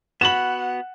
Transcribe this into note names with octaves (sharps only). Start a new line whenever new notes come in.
B3 F#4 F#5 B5 E7 F#7